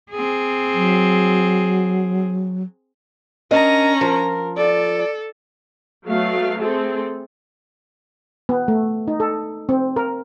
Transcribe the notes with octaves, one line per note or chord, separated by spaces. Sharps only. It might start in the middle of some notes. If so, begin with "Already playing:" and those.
C4 G#4
F#3
C#4 D4 A#4 D#5 A#5
F3 A#4
A4 D5
F#3 A3 B3 F5
A3 C4 G#4 A4
B3
A3
D#4
A4
C4
A#4